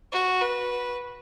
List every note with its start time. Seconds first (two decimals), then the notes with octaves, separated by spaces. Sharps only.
0.12 F#4
0.41 B4